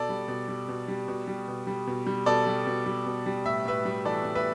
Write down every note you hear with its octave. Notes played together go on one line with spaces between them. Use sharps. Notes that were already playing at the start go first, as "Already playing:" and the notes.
Already playing: B2 A4 D5
G3
B2
G3
B2
G3
B2
G3
B2
G3
B2
G3
B2 A4 D5
G3
B2
G3
B2
G3
A2 E5
A2 B4 E5
G3
E3 A4 D5
A2
B4 E5